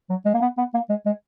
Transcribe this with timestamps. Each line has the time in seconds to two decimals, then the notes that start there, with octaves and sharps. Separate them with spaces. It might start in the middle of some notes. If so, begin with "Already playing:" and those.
0.10 F#3
0.25 G#3
0.34 A#3
0.42 B3
0.58 B3
0.74 A#3
0.90 G#3
1.06 G#3